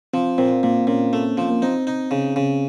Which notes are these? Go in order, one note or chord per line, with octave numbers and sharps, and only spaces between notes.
F3 C4
A#2 C4
A#2 A#3
A#2 C#4
A3
F3
A#3
C4 D#4
D#4
C#3
C#3